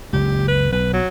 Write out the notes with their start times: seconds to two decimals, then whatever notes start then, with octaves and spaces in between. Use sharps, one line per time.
0.13 F#1 C#2 G4
0.48 B4
0.72 B1 B4
0.93 F#3